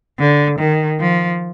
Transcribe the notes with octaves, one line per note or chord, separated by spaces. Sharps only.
D3
D#3
F3